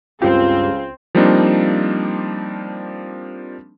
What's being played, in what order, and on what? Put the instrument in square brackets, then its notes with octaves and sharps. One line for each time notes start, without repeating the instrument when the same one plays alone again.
[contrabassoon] C#2 [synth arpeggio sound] G2 G4 [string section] C4 [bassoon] F4
[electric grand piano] F3 G3 A#3 C4 D4 D#4